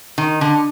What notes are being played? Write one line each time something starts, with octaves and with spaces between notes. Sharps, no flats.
D#3
D3